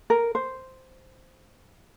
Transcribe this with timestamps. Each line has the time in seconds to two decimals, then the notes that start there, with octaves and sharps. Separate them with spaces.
0.10 A#4
0.35 C5